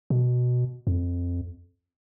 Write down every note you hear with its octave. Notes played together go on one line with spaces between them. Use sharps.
B2
F2